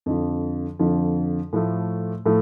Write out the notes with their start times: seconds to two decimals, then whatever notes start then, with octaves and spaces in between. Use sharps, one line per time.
0.06 F2 D3 F3
0.79 F2 D3 F3
1.53 A2 F3 A3
2.26 A2 F3 A3